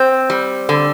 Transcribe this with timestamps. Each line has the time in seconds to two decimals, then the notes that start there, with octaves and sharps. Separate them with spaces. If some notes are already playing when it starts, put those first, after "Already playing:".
Already playing: C4
0.30 G3
0.69 D3